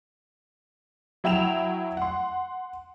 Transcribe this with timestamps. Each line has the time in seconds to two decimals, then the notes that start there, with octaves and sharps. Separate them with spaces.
1.24 F#3 E4 G5 E7 F7
1.97 F#5 C6